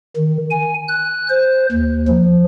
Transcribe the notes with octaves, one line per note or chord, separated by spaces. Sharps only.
D#3
G#5
F#6
C5
D#2
F3